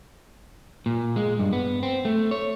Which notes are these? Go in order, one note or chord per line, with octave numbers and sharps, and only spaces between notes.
A#2
G#3
G2
B3
C4
A3
C#5